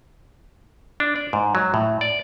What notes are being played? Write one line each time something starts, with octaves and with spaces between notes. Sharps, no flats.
D4
D5
G#2
F#3
A2
D5